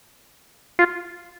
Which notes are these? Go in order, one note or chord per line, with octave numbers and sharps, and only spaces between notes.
F4